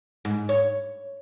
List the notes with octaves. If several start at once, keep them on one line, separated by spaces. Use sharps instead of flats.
G#2
C#5